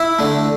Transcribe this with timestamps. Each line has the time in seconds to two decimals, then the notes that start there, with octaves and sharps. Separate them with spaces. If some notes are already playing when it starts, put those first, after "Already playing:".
Already playing: E4 E5
0.19 D3 A3